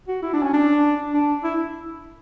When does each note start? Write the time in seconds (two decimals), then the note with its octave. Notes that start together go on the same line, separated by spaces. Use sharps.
0.08 F#4
0.23 E4
0.33 D4
0.43 C#4
0.53 D4
1.14 D4
1.44 E4